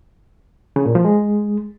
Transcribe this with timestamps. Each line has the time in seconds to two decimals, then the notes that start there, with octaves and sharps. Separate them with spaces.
0.76 C#3
0.86 A#2
0.95 F3
1.05 G#3